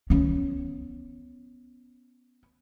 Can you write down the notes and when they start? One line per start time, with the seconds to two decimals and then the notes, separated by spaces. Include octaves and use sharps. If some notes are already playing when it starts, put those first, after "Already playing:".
0.10 B3 C#4